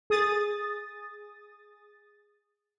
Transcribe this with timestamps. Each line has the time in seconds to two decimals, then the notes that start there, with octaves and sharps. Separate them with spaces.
0.10 G#4 D#6 A6